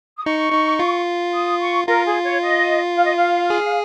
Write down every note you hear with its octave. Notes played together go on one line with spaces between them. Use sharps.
D#6
D#4 C#6
D#4
F4
D#6
C#6
F4 A#4
G#4
C#5
D#5
F5
D#5
F5
G#4